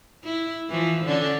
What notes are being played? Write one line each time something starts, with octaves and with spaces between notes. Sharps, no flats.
E4
E3 F3
D3 C#4 D4